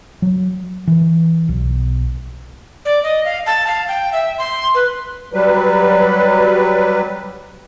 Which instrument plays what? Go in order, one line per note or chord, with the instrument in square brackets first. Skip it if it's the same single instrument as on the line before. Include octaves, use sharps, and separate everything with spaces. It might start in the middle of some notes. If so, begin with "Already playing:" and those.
[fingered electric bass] F#3
E3
B1
[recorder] D5
D#5
F5
A5
F5
G5
E5
C6
B4
[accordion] F#3 G3 B4